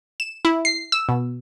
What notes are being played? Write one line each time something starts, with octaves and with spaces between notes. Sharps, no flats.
E7
E4
C7
E6
B2